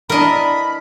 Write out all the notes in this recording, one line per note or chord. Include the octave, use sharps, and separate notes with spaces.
E3 B3 D4 A#4 D#5 B5